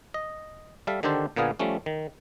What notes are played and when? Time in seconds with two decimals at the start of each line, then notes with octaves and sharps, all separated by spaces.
0.14 D#5
0.87 G3 A4 E5 F5
1.03 D3 D#3 D4 G4 A4 C5
1.36 A#2 D3 A#3 B3 G#4 F5
1.59 F3 G3 A3 C#4
1.86 D#3